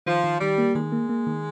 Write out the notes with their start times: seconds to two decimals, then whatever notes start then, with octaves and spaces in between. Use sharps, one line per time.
0.06 D#3 F3
0.24 D#3
0.41 D#3 G3
0.58 A#3
0.75 D#3 G#3
0.92 A#3
1.09 A#3
1.27 D#3